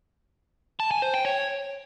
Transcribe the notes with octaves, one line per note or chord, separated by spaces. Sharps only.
A5
G#5
C5
G5
C#5